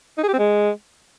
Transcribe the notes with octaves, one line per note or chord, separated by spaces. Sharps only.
D#4
G#4
G4
C4
G#3